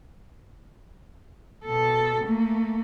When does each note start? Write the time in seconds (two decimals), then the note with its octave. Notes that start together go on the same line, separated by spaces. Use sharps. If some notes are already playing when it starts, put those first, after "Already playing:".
1.65 B2 A4
2.24 A3 A#3